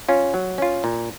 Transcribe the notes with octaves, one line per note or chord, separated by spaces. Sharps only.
C#4 F4
F#3
C#4 F4
A#2